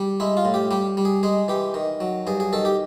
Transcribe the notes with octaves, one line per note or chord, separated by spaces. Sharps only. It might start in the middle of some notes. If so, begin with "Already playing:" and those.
Already playing: G3
G#3 E4
F4
A2
G4
G3 G4
G3
G#4
G#3 G#4
E3 G4
D#3
F#3
G2 G#4
G#4
D#3 A4
G4